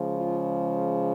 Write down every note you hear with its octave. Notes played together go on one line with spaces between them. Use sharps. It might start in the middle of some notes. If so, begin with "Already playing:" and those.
Already playing: C#3 F3 G#3
F4